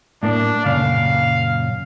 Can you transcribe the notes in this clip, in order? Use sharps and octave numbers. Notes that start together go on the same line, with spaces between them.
A2 A#3 D4
F#2 A#2 C#3 F5